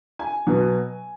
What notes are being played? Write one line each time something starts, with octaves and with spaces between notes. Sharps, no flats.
G#5
B2 F#3 B3